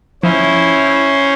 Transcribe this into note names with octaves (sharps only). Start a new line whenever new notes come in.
F3 C#4 E4 C5